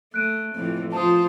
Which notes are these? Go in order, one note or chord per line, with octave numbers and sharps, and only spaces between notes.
A3 F#6 D7 D#7
F2 A2 E3
F3 F4 C5 A5 D#6